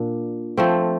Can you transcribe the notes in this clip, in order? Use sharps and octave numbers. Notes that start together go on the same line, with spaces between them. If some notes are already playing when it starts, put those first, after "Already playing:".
Already playing: A#2 D4
F3 A3 C4